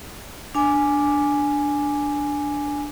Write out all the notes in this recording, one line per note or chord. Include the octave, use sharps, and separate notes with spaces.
D4 G#5 D6